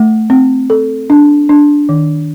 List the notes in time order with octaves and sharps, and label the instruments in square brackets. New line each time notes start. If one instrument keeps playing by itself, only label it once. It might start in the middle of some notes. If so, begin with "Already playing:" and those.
Already playing: [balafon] A3
C4
A4
D4
D4
D#3